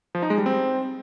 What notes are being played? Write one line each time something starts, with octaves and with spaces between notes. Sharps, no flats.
F3
D#4
G#3
G3
C4